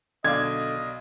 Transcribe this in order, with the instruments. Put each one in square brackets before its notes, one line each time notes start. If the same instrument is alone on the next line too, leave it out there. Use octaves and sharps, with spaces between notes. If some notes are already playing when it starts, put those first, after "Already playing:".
[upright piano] B1 D5 F5 [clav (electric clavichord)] D3 [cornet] D#5 [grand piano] G#6